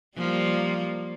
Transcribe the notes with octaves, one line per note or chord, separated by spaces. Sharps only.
F3 G3 A#3